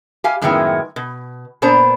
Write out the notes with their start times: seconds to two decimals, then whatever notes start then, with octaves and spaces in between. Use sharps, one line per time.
0.24 G4 F5 G#5
0.42 F#2 A2 D#3 G#3 B3 E4
0.96 B2
1.62 A#2 B3 D4 C5 A#5